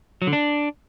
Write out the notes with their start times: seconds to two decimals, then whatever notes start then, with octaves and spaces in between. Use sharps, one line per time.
0.22 F#3
0.27 D3
0.33 D4